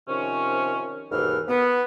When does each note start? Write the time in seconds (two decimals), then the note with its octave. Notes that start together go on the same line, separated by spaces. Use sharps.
0.08 C3 D#3 F3 C#4
1.11 D#2 G#2 B2 E3 F6
1.48 B3